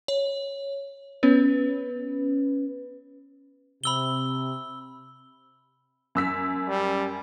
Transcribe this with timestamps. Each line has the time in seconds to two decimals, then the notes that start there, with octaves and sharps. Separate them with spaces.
0.08 C#5
1.23 B3 C#4 B4
3.84 C3 B5 E6 G7
6.15 F#2 E6 B6
6.68 G3